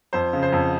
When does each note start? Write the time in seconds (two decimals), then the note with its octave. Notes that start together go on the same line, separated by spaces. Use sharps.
0.13 F2 C5
0.33 C#3
0.43 C5
0.53 F2